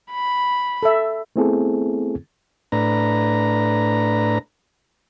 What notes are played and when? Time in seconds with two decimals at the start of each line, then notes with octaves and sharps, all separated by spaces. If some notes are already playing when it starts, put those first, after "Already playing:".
0.11 B5
0.83 A4 E5
1.36 A3 B3 C4 E4 G#4 A4
2.72 A2 D4 B4 A#5